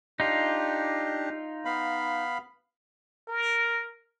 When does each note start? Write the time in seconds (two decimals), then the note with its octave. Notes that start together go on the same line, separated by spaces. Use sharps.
0.20 D4 D#4 F4 G4
1.65 B3 F5 B5
3.28 A#4